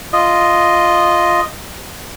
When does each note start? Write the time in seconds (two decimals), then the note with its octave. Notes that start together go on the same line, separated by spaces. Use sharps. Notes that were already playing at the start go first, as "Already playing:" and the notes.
0.13 F4 D#5